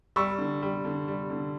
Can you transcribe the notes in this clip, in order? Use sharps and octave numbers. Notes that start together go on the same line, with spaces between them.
G3 C#6 E6
D3
G3
D3
G3
D3